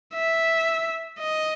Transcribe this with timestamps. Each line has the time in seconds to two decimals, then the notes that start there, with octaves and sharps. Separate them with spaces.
0.14 E5
1.20 D#5